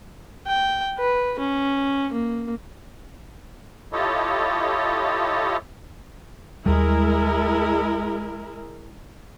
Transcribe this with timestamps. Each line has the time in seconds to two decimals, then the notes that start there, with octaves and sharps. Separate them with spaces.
0.47 G5
0.99 B4
1.39 C#4
2.12 A#3
3.93 E4 F4 G4 A4 C#5 D#5
6.66 D#2 G3 G#3 E4 A#4